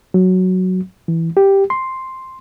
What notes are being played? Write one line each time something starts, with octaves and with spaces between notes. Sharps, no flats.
F#3
E3
G4
C6